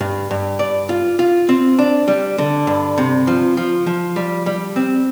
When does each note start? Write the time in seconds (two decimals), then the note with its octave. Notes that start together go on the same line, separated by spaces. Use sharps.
0.01 G2
0.31 G2
0.59 D5
0.89 F4
1.19 F4
1.49 C4
1.79 D4
2.08 G3
2.38 D3
2.67 G2
2.98 C3
3.27 F3
3.57 F3
3.86 F3
4.16 G3
4.46 G3
4.76 C4